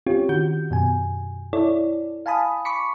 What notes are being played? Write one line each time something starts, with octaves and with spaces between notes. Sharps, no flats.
C4 C#4 F4 G4 C#5
D#3 F#4 G6
F#2 B2 G#5
E4 A4 C#5 D5
F5 G#5 A5 B5 D#6
B5 C#6 D6 B6 C#7